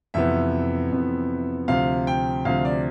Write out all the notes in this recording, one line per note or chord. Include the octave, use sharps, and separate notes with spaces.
F2 C3 E3 B3 E5
F2 C3 E3 B3
D2 C3 F3 F5
G5
D2 C3 F3 F5
D5